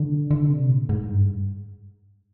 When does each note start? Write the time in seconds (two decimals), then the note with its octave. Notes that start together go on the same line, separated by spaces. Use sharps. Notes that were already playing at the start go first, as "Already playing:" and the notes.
Already playing: D3
0.31 D3
0.50 C3
0.69 A#2
0.89 G#2
1.08 G2